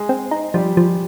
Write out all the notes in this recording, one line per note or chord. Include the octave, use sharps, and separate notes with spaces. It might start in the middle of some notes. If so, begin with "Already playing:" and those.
Already playing: G#3 G#4
C4
D#4
F3 G3 G4
F3